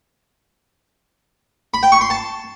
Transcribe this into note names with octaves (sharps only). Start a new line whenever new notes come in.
B5
G5
C#6
C6
A5